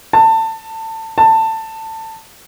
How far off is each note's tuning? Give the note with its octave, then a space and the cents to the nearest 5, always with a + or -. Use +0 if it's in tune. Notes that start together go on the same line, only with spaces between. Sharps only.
A5 +25
A5 +20